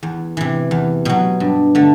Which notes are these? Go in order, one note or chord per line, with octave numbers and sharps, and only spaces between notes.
E2
C3 E3
E2
B2 F#3
G2
D3 A3